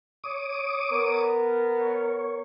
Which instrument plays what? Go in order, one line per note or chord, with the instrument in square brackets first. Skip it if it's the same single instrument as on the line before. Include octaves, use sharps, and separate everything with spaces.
[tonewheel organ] C#5 D6 D#6
[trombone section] B3 A#4
[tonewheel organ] C#5